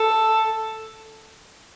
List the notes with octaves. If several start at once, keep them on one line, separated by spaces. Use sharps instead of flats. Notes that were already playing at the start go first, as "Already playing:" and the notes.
Already playing: A4